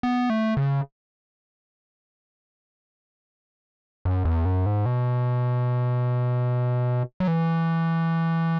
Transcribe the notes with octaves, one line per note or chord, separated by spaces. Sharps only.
B3
A3
C#3
F#2
E2
F#2
G#2
B2
F#3
E3